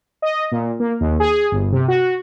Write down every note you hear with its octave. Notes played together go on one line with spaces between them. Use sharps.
D#5
A#2
A#3
D#2
G#4
G1
C3
F#4